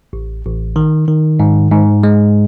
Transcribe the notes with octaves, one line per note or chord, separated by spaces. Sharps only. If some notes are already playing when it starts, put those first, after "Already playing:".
A1
A1
D#3
D#3
G#2
G#2
G#3